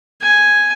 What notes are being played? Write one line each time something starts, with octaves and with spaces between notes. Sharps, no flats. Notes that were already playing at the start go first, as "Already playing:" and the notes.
G#5